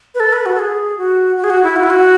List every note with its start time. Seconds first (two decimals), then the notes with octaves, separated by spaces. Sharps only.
0.15 B4
0.20 A4
0.33 B4
0.46 F#4
0.55 A4
0.59 G#4
0.98 F#4
1.37 F#4
1.44 G#4
1.50 F#4
1.64 E4
1.76 F#4
1.83 E4
1.90 F#4